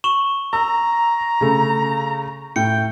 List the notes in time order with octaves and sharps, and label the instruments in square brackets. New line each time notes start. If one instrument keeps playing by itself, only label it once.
[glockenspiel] C#6 E7 F#7
[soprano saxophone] A#5 [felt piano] E6
[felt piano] C#3 A3
[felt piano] A2 [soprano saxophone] G5 [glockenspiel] C#7